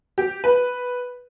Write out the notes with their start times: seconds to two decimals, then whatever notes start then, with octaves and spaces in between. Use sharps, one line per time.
0.18 G4
0.44 B4